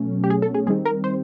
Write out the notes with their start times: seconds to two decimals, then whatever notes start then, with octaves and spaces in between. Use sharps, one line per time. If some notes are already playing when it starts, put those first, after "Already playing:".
Already playing: B2 F#3 A3 C#4
0.24 G4
0.30 G#4
0.42 A4
0.54 G#4
0.66 D#3 G3 C4 G#4
0.85 A#4
1.04 C5